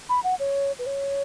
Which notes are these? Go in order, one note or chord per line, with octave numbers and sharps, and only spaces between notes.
B5
F#5
C#5
B4
C#5